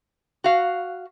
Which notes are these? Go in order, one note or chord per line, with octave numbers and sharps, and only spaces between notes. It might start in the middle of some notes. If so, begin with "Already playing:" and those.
F#4 F5